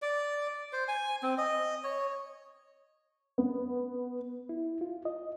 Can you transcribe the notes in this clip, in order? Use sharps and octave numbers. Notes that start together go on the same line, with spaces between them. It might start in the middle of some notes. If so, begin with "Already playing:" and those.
D5
C5
G#5
C4
D#5
C#5
B3
E4
F4
D#5